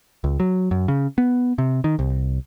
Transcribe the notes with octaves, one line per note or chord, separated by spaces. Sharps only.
C#2
F#3
F#2
C#3
B3
C3
D#3
C2